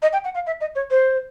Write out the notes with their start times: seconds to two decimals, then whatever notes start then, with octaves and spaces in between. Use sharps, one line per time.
0.02 D#5
0.13 G5
0.24 F#5
0.35 F5
0.47 E5
0.61 D#5
0.75 C#5
0.91 C5